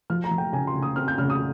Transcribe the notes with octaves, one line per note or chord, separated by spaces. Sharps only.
F3 F6
A#5
F3
G5
C#3 G#5
C6
C#3
D#6
C4 F6
G6
C#3 F6
D#6